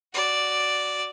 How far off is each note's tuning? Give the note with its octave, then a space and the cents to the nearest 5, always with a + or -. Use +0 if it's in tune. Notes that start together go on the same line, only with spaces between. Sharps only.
F#4 +5 D5 +0